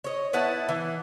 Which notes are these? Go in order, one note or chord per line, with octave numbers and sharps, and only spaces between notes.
C#5 D#5
B3 E4 F#5 A5
E3